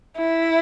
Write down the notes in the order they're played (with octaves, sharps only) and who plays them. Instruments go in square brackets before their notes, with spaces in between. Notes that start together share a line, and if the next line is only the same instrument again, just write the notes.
[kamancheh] E4